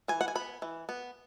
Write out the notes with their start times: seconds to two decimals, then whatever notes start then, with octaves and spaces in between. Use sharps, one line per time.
0.08 E3 G#5
0.21 F#5
0.28 G#5
0.35 B3 B5
0.62 E3
0.89 B3